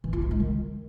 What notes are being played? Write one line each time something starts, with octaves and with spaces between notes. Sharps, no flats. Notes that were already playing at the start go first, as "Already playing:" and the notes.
E3
E4
D#4
G#3
D#3